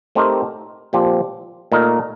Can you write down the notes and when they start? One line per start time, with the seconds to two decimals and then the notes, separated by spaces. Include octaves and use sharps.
0.15 A3 C4 D#4 G4 A#4
0.93 A#2 F3 C4 G4 C5
1.72 A#2 A3 D#4 A#4